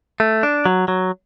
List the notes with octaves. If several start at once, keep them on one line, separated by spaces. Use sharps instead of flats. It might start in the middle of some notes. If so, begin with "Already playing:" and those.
A3
D4
F#3
F#3